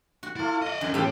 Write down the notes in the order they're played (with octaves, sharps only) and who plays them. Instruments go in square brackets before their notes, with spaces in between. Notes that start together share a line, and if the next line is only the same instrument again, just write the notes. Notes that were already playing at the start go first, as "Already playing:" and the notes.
[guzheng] F#4
[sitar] A3 F4 [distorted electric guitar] E4
[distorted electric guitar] D5 D#5
[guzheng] F#2 [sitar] A2 C#3
[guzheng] A2 B3 F5 [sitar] E3 G4 A4 [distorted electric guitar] A#3